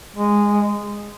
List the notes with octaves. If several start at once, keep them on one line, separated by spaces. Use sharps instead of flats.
G#3